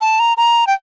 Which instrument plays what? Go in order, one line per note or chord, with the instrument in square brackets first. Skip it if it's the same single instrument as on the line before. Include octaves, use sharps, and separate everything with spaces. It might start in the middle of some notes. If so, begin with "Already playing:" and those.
[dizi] A5
A#5
A#5
G5